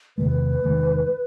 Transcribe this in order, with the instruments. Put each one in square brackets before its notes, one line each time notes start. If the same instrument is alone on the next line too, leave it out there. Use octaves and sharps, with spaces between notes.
[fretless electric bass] E2 C3 D#3 G#3 [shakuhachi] B4
[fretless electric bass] E2 C3 D#3 G#3